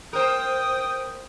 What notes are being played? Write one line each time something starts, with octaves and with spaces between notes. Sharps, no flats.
A#4 C5 G5 D#6